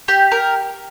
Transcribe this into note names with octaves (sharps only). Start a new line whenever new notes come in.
G4
A#4